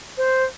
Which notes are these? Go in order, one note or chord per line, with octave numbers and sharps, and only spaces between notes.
C5